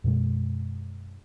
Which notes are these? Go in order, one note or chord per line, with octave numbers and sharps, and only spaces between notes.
F#2 B2 G#3